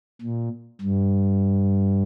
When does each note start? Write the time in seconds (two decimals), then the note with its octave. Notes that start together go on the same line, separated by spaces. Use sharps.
0.21 A#2
0.82 G2